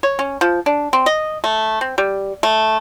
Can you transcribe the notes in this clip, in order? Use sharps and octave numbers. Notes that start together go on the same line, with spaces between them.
C#5
C#4
F3
D4
C4
D#5
A3
C4
G3
A3